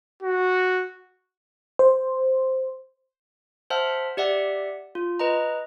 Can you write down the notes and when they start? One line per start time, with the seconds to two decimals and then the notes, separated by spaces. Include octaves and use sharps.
0.23 F#4
1.79 C5
3.70 C5 E5 F#5 A5 F6
4.17 G4 D5 E5 F#5
4.95 F4
5.19 B4 D#5 A#5